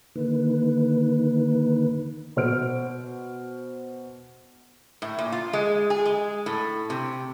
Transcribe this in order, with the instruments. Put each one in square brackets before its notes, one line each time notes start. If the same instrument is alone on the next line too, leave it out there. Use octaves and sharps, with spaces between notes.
[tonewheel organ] D3 D#3 A#3 D#4 B4
[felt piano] B2 C5 F6 D7
[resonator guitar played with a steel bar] A2
A#2
F4
G#3
G#4
G#3
A2
C3